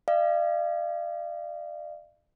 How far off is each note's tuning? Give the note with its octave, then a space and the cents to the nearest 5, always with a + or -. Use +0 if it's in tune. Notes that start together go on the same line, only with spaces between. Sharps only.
D5 +45 F5 -30